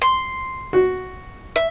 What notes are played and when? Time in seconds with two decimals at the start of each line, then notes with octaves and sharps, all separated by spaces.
0.02 C6
0.73 F#4
1.56 E5